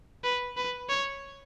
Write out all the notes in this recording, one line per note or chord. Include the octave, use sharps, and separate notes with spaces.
B4
B4
C#5